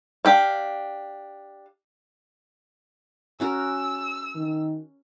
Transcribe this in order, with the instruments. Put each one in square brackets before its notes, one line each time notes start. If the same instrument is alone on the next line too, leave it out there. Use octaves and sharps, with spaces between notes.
[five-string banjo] D4 G4 F5
[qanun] C#4 F#4 A#4 [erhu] E6
[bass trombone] D#3